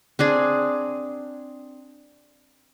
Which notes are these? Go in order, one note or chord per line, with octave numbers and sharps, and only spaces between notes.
C4 D4 G#4